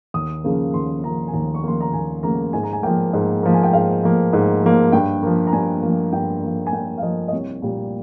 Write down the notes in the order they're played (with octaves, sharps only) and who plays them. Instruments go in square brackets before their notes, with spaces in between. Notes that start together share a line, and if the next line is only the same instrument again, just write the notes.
[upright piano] D#2 D#6
C#3 F3 A#3
D#2 C6
C#3 F3 A#3 A#5
G#5
D#2 A#5
C#6
C#3 F3 A#3 C6
A#5
D#2 G#5
C#3 F3 A#3 A#5
G#2 G#5
A#5
G#5
F3 A#3 G5
G#2
F3 A#3
G#5
G5
G#2 F5
F3 A#3
G#2
F3 A#3
G2 G5
F3 A#3
A#5
G2 G#5
F3 A#3
G2 G5
F3 A#3
G#5
G2 G5
F5
F3 A#3 D#5
D#5
C2 C#5
A#2 G3 A#3